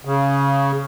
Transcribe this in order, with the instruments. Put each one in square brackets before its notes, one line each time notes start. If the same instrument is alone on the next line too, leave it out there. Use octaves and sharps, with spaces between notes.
[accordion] C#3